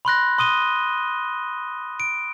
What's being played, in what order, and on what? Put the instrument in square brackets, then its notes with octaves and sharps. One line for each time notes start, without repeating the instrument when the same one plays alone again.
[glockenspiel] B5 C6 F#6 A#6
C6 D#6 D#7 G7
D7